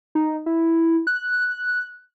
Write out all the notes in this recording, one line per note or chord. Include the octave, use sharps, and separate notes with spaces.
D#4
E4
F#6